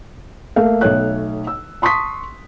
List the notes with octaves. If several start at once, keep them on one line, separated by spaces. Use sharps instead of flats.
A3 A#3 F5
B1 A3 C#5 F#6
E6
A5 C6 C#6 D#6 B6